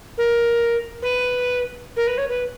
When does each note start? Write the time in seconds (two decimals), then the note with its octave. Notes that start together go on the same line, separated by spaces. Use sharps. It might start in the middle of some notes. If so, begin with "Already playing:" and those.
0.17 A#4
1.02 B4
1.96 A#4
2.07 B4
2.17 C#5
2.29 B4